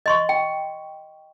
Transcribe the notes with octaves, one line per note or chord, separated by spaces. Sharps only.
D#5 C6 C#6
G5